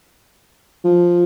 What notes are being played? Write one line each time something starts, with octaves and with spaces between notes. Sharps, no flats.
F3